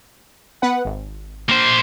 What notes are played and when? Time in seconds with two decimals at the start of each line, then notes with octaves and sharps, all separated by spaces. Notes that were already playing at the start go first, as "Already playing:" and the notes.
0.62 B3 B4 F#5
0.85 G#1
1.49 A#3 C5